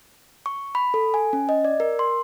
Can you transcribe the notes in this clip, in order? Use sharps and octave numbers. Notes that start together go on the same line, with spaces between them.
C#6
B5
A4
G#5
C#4
D#5
D5
A#4
C6